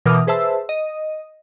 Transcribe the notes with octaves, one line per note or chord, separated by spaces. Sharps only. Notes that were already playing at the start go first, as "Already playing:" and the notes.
B2 E3 A#4 D6 D#6 F6
G#4 B4 C5 E5 A5 E6
D#5